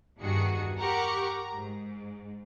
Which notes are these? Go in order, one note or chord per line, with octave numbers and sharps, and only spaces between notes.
E2 G2 D#3 F#4 G#4 C#7
G4 A#4 F#5 A#5 C#6 D6
A#5
G#2